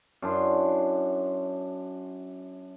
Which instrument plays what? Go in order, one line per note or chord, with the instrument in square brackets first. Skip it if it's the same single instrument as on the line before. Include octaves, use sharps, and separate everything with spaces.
[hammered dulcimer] F#2 D4 E4 C6